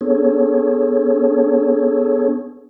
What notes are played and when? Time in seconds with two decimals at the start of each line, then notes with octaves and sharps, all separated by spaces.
0.01 B3 D4 G#4 A4 C#5